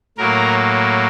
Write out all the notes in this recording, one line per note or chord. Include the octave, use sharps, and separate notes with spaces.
A2 F#3 A#3 A#4